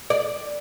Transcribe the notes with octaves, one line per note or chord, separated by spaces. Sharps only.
D5